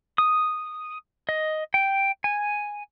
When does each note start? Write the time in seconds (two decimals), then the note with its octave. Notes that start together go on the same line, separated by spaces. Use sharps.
0.18 D#6
1.29 D#5
1.74 G5
2.24 G#5